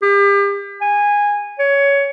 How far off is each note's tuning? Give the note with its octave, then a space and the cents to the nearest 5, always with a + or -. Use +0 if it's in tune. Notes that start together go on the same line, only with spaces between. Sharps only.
G4 +35
G#5 -15
C#5 +15